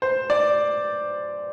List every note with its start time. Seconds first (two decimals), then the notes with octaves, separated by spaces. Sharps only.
0.02 C5
0.30 D5